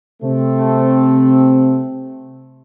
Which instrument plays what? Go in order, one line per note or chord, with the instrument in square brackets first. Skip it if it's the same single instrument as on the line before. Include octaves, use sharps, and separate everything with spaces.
[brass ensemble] C3 A3 C4